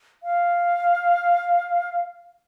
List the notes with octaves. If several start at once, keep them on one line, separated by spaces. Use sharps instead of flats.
F5